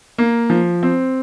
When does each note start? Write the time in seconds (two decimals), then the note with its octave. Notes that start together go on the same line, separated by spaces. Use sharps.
0.18 A#3
0.50 F3
0.83 C4